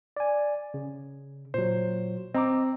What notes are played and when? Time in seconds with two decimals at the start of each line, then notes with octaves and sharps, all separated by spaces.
0.17 D5 G#5
0.74 C#3
1.54 A#2 F#3 C5
2.34 C4 D#5 A#5 D6